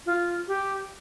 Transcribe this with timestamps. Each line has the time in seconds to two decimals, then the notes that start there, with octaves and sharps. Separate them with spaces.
0.06 F4
0.48 G4